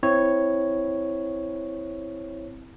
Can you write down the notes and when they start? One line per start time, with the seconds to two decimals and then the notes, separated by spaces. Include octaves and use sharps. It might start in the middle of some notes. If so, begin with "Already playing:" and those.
0.03 C4 E4 C#5